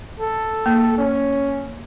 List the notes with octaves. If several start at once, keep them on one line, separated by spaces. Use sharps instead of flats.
A4
A#3
C#4